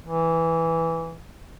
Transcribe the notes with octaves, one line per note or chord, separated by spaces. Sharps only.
E3